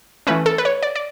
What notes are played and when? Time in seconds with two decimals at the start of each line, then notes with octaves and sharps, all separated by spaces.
0.27 E3 A3 C#4 B4
0.46 A4
0.58 B4
0.65 C#5
0.83 D5
0.95 D5